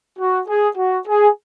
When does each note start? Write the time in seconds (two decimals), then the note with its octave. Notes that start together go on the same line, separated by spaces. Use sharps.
0.19 F#4
0.48 G#4
0.77 F#4
1.07 G#4